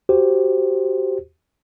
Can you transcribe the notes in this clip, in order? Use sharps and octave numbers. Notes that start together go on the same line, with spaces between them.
F#4 G4 C5